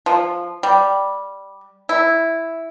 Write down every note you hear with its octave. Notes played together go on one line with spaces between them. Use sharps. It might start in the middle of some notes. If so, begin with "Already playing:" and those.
F3
G3
E4